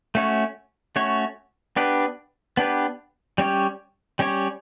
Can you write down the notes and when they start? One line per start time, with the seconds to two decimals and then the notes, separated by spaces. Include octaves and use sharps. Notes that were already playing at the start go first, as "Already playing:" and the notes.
0.15 A3 C#4 F#4 C#5
0.96 A3 C#4 F#4 C#5
1.76 B3 D4 G4 B4
2.57 B3 D4 G4 B4
3.38 G3 C#4 G4 C#5
4.19 G3 C#4 G4 C#5